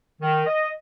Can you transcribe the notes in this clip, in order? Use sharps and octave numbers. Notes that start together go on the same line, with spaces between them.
D#3
D#5